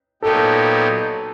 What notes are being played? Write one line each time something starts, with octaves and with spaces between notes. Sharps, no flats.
A#2 F#3 B3 D#4 G4 A4